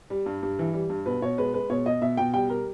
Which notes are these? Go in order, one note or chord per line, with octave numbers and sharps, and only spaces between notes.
G3
G2
G2
E3
G3
G2
B2 B4
B2 C#5
G#3 B4
G#3 B4
B2 C#5
B2 D#5
B2 E5
B2 G5
G3 G5
G3 A#4